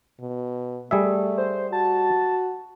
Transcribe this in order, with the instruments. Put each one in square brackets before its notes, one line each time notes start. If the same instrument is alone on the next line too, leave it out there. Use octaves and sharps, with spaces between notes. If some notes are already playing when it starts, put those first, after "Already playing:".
[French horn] B2
[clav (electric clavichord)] G3 G#4 E5 [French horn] A3
[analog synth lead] C5
[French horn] F#4 [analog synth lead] A5